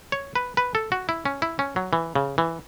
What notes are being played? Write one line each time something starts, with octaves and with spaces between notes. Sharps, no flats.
C#5
B4
B4
A4
F#4
E4
C#4
E4
C#4
F#3
E3
C#3
E3